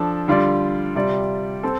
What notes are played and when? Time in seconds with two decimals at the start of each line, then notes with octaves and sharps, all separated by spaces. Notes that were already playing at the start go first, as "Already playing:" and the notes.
Already playing: F3 D4 A4
0.28 D3 G3 F4 D5
0.95 C3 G3 F4 D5
1.63 C4 A4